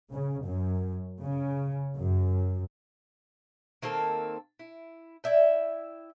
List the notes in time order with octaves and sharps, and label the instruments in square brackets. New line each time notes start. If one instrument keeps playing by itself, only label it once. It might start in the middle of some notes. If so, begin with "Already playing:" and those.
[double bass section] C#3
F#2
C#3
F#2
[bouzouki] D#3 A#3 C4 A4
E4
E4 D5 E5 G5